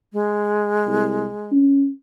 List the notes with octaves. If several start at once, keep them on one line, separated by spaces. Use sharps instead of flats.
G#3
C2
C#4